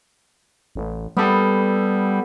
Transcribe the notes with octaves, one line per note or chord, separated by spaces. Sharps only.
A1
G3 B3 A4